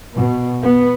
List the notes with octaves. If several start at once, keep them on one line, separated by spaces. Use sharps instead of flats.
B2
B3